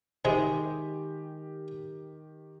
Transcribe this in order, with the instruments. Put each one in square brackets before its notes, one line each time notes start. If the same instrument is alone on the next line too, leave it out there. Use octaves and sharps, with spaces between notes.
[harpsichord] C3 G#4 [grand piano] D#3 G4 D#7 [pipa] G#3